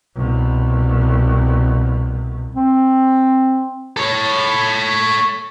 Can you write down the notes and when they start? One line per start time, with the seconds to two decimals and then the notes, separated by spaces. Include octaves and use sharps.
0.15 C2 B2
2.55 C4
3.97 A4 C#5